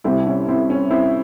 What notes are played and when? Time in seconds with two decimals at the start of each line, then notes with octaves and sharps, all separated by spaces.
0.04 C2 C3 G3 C4 E4
0.26 C#4
0.48 C4 E4
0.70 C#4
0.91 C4 E4